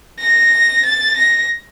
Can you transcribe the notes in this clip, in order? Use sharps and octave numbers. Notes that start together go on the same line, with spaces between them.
A#6
A6
A#6